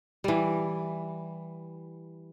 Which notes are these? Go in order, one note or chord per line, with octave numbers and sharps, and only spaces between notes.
E3 G3